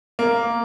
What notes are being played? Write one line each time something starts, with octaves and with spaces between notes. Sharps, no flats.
A#3